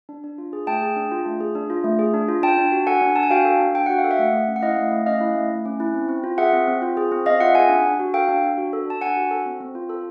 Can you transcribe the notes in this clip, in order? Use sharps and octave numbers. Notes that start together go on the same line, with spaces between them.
D4
D4
F4
G#4
A3 G5 A5
G#4
D4
F4
A3
G#4
D4
F4
A3
G#4
D4
F4
D4 G5 A5
D4
F#4
A4 F#5 G#5
D4
D4 A5
G#5
F#4 F5 G5
A4
D4
D4 G5
F#4 F#5
F5
A4
E5 F#5
A3
A3
C#4
F#5
E4 D#5 F5
A3
A3
C#4 D#5 F5
E4
A3
A3
C#4
E4
C4
C4
F4
G#4 E5 F#5
C4
C4
F4
G#4
C4
C4 D#5 F5
F4 E5 F#5
G#4 F#5 G#5
D4
D4
F#4
A4 F5 G5
D4
D4
F#4
A4
D4 A5
D4 F#5 G#5
F#4
A4
C4
C4
F4
A4